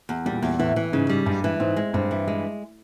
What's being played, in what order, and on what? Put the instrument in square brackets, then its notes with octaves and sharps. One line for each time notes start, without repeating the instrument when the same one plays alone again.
[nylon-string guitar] E2
[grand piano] A#2 [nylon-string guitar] G3
[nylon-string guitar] E2
[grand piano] A2 [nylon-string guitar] E3
[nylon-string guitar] E3
[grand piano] G#2 [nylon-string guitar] C#3
[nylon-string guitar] G3
[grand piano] G2 [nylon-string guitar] G#3
[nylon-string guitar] E3
[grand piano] G#2 [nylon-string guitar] C4
[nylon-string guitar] G#3
[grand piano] G2 [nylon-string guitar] C4
[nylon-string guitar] E3
G#3